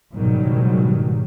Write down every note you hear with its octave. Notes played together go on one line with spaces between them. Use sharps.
F#1 G#2 B2 D#3 F#3 G3